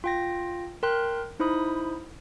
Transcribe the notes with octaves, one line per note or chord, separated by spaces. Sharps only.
F4 G5 A#6
A#4 G5 C6 F#6
D#4 E4 C5 B5 D#6